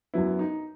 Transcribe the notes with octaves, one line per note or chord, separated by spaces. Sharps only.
F#2 F#3 B3 E4
D#4